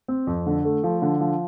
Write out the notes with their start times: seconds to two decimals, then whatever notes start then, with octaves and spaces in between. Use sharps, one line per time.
0.08 C4
0.27 F2
0.46 D3
0.65 A3
0.84 F3
1.02 D3
1.21 F3